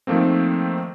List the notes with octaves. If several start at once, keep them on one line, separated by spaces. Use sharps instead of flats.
D#3 F3 A3 A#3 C4